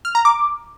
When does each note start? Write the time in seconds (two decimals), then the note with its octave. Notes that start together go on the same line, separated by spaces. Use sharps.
0.05 F6
0.15 A#5
0.25 D6